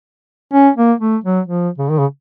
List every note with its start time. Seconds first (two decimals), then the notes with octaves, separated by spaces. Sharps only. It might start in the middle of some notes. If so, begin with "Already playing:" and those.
0.53 C#4
0.77 A#3
1.01 A3
1.24 F#3
1.47 F3
1.78 C#3
1.89 D#3
1.99 C#3